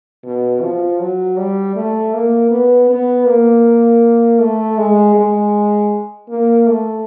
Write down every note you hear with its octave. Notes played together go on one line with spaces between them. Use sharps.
B2
F3
F#3
G3
A3
A#3
B3
B3
A#3
A3
G#3
G#3
A#3
A3